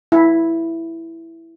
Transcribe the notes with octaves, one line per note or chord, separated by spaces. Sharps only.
E4